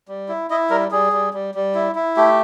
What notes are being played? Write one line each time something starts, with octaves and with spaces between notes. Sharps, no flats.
G3
E4
E4 D#5
G3 A#4
G3 G#4
G3
G3
G3
E4
E4
A3 G4